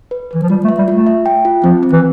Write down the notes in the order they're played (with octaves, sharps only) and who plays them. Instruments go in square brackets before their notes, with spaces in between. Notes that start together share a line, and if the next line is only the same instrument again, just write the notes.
[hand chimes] B4
[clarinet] E3 [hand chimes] B4
[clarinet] F3
[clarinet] G3 [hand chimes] F4
[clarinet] A3
[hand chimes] E5
[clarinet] G3
[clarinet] A3 [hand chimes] F4
[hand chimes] E5
G5
F4
[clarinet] F3 [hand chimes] C4
[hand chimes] C4
[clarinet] E3